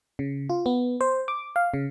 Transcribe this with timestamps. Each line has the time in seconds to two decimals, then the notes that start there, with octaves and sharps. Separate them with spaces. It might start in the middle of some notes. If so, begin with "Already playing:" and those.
0.19 C#3
0.50 F4
0.66 B3
1.01 C5
1.28 D6
1.56 F5
1.74 C#3